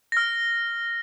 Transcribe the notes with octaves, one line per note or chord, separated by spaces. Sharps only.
F6 A#6